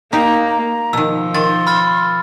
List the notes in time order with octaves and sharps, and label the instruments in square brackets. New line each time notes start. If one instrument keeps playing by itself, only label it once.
[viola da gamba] A#3 [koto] D#4 G4 [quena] A#5
[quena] A#5
[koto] B2 D#3 [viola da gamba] F3 [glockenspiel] E6
[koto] D#3 [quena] C6 [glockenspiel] A6
[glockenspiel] B5 F6 A6